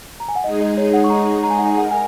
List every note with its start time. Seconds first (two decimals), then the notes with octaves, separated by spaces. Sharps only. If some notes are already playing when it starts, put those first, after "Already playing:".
0.20 A#5
0.28 G#5
0.36 F#5
0.44 G#3 D#4 G#4 D#5
0.61 D#5
0.77 C#5
0.94 F#5
1.04 C#6
1.10 A#5
1.43 A#5
1.50 G#5
1.59 F#5
1.65 G#5
1.76 A#4 F#5
1.91 G#5